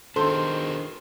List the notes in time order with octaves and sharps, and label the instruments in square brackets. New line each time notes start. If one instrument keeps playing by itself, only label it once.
[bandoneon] D#3 [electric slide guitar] D4 F#4 G#4 [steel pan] A4 [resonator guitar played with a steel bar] C5